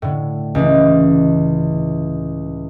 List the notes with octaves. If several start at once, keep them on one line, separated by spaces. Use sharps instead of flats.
A2 D3
C#2 E3